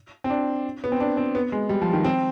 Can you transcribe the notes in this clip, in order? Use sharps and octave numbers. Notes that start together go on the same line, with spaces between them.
C4
D4
B3
C4
D4
C4
B3
G#3
G3
F3
D#3
C4